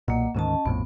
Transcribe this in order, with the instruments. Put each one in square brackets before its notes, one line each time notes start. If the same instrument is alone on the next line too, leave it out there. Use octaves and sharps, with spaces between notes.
[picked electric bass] B1 A#2 [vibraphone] A#3 D#5 F#5
[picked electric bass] D2 G#2 D#3 [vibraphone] C#4 D#5 A5
[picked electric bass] A#1 F2 A2 [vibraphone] B3